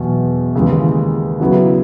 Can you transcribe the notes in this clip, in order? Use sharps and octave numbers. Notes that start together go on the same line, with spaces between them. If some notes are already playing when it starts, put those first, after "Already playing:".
Already playing: E2 B2 F#3
D#2 C#3 E3 G#3
C#3 F#3 B3 E4